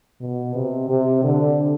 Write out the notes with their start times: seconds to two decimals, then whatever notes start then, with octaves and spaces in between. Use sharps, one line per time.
0.21 B2
0.55 C3
0.89 C3
1.24 D3